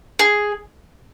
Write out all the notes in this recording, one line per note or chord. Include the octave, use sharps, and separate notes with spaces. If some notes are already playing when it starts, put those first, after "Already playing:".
G#4